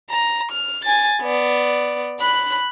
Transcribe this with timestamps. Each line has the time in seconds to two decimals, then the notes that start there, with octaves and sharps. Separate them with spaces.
0.10 A#5
0.52 F6
0.85 G#5 A6
1.22 B3 D5
2.20 B5 F#6